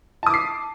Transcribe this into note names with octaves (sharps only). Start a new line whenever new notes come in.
A5 D6 D#6 C7